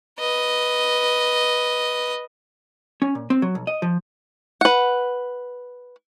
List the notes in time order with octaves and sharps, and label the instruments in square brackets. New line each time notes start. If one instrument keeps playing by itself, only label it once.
[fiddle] B4 D#5
[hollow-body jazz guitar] C#4
A#2
C4
F#3
B1
D#5
F3
[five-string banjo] B4 F#5